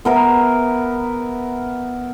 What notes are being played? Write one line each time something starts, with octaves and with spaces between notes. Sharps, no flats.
B3 A#4 E5